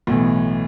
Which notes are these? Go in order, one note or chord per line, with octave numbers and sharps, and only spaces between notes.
B1 A2 E3